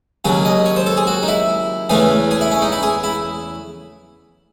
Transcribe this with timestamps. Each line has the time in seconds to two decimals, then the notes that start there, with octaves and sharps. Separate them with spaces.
0.25 D#2 C#3 F#3 G#4
0.45 D#5
0.66 C#5
0.76 C5
0.86 A4
0.97 G#4
1.07 F#4
1.23 D#4
1.28 E4
1.89 E2 C#3 E3 A3 G#4
2.31 G#4
2.41 E4
2.51 C#4
2.62 D#4
2.72 E4
2.83 G#4
3.04 E4